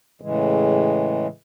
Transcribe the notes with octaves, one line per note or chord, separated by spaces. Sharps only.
A2 C#3 E3 G#3